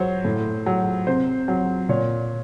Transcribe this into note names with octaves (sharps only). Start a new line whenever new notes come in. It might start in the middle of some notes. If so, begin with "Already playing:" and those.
Already playing: F#3 C5 C#5
A2
F#3
C3 C5
F#3
A#2 C#5